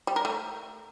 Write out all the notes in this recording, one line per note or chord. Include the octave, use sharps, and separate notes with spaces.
G3
A#4
A3